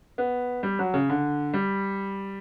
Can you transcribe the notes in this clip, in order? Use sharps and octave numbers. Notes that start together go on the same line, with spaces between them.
B3
G3
F#3
C#3
D3
G3